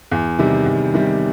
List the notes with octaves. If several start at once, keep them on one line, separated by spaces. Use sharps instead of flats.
E2
C3 D#3 G3
E2
C3 D#3 G3